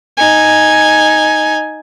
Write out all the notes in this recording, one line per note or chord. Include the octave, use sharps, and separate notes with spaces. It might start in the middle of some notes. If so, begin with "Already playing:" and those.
D#4 G#5